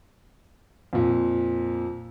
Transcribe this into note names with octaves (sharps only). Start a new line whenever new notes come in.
F2 A#2